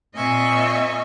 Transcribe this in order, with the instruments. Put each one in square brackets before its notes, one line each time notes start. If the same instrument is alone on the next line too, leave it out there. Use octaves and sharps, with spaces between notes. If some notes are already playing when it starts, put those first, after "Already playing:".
[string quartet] A#2 C4 D#5 E5 G#5 C#6